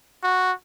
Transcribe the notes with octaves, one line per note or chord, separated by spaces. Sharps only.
F#4